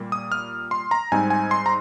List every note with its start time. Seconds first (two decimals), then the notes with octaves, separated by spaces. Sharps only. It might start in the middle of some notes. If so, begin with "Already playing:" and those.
Already playing: A#2 G3 A#3
0.12 D#6
0.32 F6
0.71 C6
0.91 A#5
1.12 G#2 G3 C4 D#4 G#5
1.30 G#5
1.51 C6
1.66 A#5